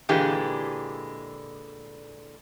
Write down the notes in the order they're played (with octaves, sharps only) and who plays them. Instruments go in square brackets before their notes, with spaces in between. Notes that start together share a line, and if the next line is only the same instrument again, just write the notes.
[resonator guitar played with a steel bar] A#2 D3 E3 G#3 G4